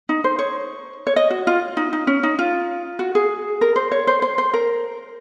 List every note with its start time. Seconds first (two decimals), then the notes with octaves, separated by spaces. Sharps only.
0.09 D#4
0.24 C5
0.39 C#5
1.07 C#5
1.16 D#5
1.30 F#4
1.47 F4
1.77 D#4
1.93 D#4
2.07 C#4
2.23 D#4
2.39 F4
2.99 F#4
3.15 G#4
3.61 A#4
3.76 C5
3.92 C#5
4.07 C5
4.22 C5
4.38 C5
4.54 A#4